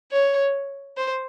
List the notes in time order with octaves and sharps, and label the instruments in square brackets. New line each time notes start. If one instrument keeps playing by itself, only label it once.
[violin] C#5
C5